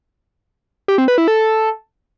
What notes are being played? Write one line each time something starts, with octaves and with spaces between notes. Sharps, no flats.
G4
C4
B4
E4
A4